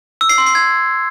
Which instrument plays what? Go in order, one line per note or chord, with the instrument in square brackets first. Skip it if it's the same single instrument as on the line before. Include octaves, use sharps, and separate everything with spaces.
[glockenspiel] E6
C7
C6
C7
G#6